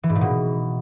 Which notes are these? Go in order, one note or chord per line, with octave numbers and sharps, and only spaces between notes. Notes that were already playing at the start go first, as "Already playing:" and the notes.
E3
G#2
A#2
B2